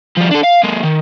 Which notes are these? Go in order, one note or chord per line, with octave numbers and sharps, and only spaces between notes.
F3 G3
D4 A4
F5
G#3 A#3
D#3